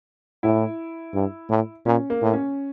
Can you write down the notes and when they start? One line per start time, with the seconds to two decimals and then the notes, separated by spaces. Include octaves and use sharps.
0.43 A2 E4
1.14 G2
1.49 A2
1.85 A#2 C#4
2.10 A#3
2.22 A2
2.33 C#4